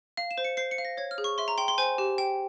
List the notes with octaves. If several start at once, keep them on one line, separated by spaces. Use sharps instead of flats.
F5
E7
C5
C#7
C5 C7
C#7
F5
A#6
C#5 G#6
F6
G#4
C#6
E5 C6
A#5
G5 C6
C6
C5 G#5
G4
G5